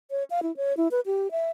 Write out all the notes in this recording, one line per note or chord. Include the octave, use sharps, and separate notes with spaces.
C#5
F5
E4
C#5
E4
B4
G4
E5